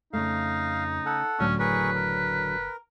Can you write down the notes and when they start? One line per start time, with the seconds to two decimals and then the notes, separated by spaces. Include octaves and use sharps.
0.13 F2 C#3 A3 D#4 F5
1.06 A4 F#5
1.40 C#2 A2 D3 F#3 C#4
1.60 F#1 G#4 A#4 B4 C#6
1.95 A#4